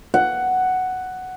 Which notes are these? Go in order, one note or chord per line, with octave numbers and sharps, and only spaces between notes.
F#5